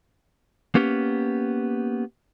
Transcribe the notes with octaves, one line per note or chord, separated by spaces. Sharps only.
A#3 B3 C#4 G4